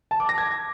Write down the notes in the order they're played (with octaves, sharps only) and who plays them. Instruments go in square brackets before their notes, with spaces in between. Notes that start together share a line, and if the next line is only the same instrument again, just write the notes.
[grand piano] A5
D6
A#6
G#6